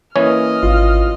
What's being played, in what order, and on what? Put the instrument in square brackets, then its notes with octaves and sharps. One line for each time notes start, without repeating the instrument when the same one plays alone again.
[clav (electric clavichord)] E3 C#4 C#5 [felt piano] A#3 [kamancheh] D#5 F6
[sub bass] G#1 [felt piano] F4